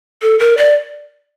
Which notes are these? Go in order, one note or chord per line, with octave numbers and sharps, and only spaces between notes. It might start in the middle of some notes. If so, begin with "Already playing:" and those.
A4
A#4
D5